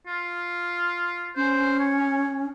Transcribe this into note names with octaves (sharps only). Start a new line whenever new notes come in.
F4
C#4 C5
C#5